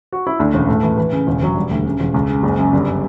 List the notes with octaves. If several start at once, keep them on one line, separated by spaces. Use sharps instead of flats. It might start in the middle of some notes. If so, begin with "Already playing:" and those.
F#4
E4
D2 D4
E1 C#4
A2 A3
E3
E3
C#3
E1
E1 F#3
E1 G3
D2
C#3
E1
C#2
C#3
F#1
F#2
G1 G3